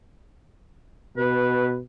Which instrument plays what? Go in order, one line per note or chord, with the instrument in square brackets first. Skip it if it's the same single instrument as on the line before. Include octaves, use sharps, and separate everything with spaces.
[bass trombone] B2 [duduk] B4